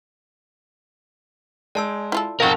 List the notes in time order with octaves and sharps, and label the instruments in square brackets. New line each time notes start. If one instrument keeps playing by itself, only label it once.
[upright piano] G#3 [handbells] D5 A5 E6
[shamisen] E4 F4 A4
[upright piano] B1 F2 F#5 [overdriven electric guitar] A#4 A5 [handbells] F5 C#6